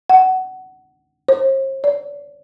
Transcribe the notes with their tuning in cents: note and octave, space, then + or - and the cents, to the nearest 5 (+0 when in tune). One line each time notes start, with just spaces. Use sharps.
F#5 +15
C5 +45
D5 -30